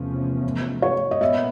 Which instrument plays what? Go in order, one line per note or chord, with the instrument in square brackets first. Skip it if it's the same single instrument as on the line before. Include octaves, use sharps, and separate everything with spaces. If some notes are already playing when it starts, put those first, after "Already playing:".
Already playing: [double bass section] E2 C3 F3 A3 C#4
[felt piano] C#5
D#5
[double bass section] A#2 B3 [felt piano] E5